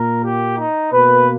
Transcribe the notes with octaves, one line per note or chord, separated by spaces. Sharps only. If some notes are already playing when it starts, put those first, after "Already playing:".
Already playing: A#2 A#3 A#4
G4
D#4
B2 A#3 B4